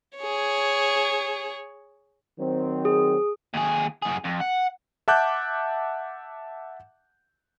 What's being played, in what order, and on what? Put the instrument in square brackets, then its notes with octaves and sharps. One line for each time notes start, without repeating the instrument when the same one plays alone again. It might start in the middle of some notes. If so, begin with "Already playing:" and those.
[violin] G#4 C#5
[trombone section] D#3 F#3 C4
[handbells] G#4
[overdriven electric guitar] D#2 G#4
F#2 G#4
F2
F#5
[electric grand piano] E5 F#5 A5 D6 F#6 G6